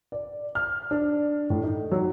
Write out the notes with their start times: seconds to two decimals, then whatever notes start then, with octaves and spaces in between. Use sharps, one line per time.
0.12 D5
0.55 F6
0.91 D4
1.50 A2
1.64 D#4
1.91 F#3